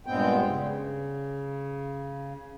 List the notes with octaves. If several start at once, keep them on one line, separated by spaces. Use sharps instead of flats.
G2 A#2 G#3 B3 C4 G5
C#3